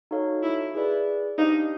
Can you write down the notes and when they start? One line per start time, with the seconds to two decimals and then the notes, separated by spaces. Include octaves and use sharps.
0.11 D#4 F#4 A4 C#5 F5
0.43 E4
0.75 E4 G#4 B4 D5
1.38 D4 D#4 G4 C5 F5